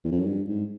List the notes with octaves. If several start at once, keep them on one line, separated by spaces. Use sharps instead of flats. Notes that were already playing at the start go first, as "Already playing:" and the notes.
E2
F2
F#2
G2
G#2